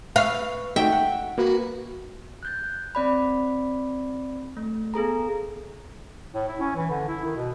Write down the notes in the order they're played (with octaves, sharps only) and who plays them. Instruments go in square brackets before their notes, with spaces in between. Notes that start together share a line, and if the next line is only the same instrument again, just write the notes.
[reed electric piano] B4 C#6 E6 [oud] F5
[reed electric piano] A3 D#4 F#4 [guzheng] E5 G5
[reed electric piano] F#5
[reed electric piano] A#3 B4 [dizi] F#4
[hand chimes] F#6 G6 A6
C4 D5 B5
A3
B3 G#4 A4 A#5
[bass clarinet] A2
E4
C#4
E3
D3
E4
D#3
B2